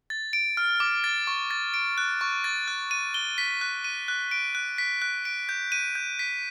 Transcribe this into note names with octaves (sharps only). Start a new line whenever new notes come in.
A6
D7
F6
D6
A6
C#6
A6
D7
F#6
C#6
A6
F#6
D#7
G7
B6
F#6
D#7
F#6
D7
F#6
B6
F#6
D7
G6
D#7
G6
B6